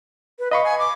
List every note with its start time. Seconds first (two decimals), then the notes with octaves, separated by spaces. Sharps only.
0.39 B4
0.51 D#5 F5 B5 C#6
0.64 G#5
0.79 D6